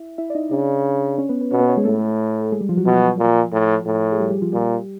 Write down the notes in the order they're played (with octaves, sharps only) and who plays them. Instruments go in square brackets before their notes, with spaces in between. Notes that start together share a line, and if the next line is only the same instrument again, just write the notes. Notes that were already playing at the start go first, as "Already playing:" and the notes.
Already playing: [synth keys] E4 E5
E4 E5
D5
D#4 D#5
[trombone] C#3 [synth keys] D4 D5
[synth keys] C#4 C#5
B3 B4
B3 B4
[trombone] B2 [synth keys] C#4 C#5
[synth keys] B3 B4
C#4 C#5
G#3 G#4
[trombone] A2 [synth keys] A3 A4
[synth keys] G#3 G#4
G3 G4
F3 F4
F#3 F#4
[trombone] B2 [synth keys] F3 F4
[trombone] A#2
A2
A2
[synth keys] G#4
G3 G4
G3 G4
F3 F4
[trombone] A#2 [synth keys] G3 G4